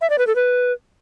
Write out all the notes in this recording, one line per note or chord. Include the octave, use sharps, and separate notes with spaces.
E5
D5
B4
A4
B4